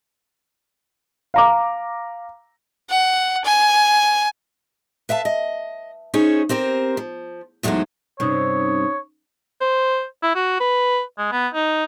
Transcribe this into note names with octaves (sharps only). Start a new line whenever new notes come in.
F5 A#5 D6
F#5
G#5
B4 E5 F5 A5
D#5
C#4 D#4 G#4 C5 C#5
C4 G4 A#4 C5
F3
E2 A2 F#3 G#3 D#4 C5
G2 C3 C#4 D#4 C#5 D#6
C5
E4
F#4
B4
G#3
B3
D#4